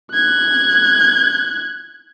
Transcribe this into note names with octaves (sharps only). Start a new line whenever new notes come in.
F#6 G#6